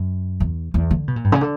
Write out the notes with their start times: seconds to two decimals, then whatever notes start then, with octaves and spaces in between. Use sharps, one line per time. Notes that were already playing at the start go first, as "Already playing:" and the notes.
Already playing: F#2
0.40 E2
0.74 E2
0.91 D3
1.08 B2
1.16 A#2
1.24 G2
1.32 C#3
1.41 D3